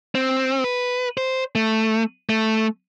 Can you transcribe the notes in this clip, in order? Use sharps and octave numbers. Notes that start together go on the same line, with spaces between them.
C4
B4
C5
A3
A3